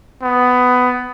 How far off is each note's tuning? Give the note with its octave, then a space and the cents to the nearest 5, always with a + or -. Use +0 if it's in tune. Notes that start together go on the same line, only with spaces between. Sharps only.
B3 +15